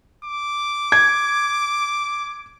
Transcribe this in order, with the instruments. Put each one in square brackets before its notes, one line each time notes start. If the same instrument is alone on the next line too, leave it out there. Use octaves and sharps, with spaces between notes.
[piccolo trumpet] D6
[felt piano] G#6